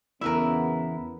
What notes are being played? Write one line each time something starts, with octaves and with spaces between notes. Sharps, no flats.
E2 C#3 B3 E4 A#4 B4 E5